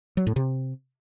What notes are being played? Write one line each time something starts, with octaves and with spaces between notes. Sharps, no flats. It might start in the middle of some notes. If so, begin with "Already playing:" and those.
F#3
A2
C3